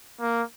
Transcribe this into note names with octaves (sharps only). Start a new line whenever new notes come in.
A#3